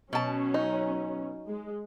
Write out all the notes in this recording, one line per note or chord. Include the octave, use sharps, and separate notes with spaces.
B2 F#3 C#4 A5
D#4
G#3